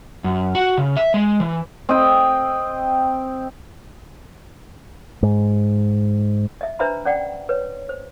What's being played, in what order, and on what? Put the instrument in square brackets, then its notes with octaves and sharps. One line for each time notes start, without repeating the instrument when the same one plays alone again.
[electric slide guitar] F#2
F#4
C#3
E5
G#3
E3
[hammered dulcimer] C4 D#5 G5
[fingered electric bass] G#2
[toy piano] D#5 E5
D4 B4 C5 E5 A#5 B5
C#4 D5 F#5 G5
B4 C#5
C5